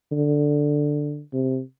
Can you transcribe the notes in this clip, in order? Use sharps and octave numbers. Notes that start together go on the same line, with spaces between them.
D3
C3